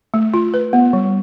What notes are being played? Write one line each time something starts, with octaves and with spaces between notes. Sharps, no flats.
A3
F4
B4
B3
G3